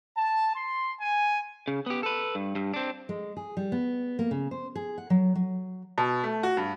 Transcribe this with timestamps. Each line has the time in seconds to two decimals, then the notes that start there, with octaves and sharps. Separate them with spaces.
0.16 A5
0.54 C6
1.00 G#5
1.68 C#3
1.86 B3 G4
2.03 A4 B4
2.35 G2
2.55 G2
2.74 C4 D4
3.09 G#3
3.37 G#4
3.57 G3
3.72 B3
4.19 A#3
4.31 C#3
4.51 C5
4.76 G#4
4.98 F#5
5.10 F#3
5.35 F#3
5.98 B2
6.24 A3
6.43 F#4
6.57 G2